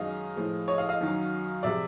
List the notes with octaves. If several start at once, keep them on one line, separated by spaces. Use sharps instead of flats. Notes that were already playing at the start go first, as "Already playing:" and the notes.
Already playing: F#2 D#3 G#3 D#5 F5
A2 F3 G#3
C#5 D#5
D#5 F5
D#5 F5
F#2 D#3 F#3
C3 F3 G#3 D5 E5